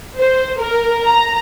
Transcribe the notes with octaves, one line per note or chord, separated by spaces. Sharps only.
C5
A#4
A#5